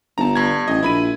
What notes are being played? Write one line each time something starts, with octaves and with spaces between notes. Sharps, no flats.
G1 A5 A#5
G2 G#6
A1 D#5
A#1 E4 B5 D#7